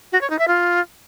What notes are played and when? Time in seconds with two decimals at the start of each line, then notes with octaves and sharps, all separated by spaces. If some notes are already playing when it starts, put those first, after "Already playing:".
0.12 F#4
0.21 C#5
0.30 D#4
0.39 E5
0.48 F4